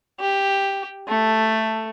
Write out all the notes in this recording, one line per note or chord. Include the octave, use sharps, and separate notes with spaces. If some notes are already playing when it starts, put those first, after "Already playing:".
G4
A3